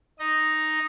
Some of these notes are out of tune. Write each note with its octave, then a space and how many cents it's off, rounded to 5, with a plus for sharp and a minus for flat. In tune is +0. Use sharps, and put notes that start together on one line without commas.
D#4 +0 D#5 +0